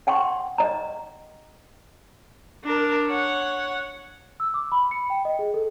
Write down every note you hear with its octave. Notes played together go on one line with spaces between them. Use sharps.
F#5 G5 C6 C#6
D#5 A#5
D4 A#4
C#5 F#5
E6
D6
B5
C#7
G5
D#5
G#4
A4